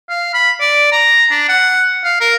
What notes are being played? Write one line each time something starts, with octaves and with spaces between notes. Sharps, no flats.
F5
B5
D5
A#5
D4
F#5
F5
A#4